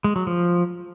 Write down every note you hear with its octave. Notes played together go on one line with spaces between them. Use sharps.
G#3
F#3
F3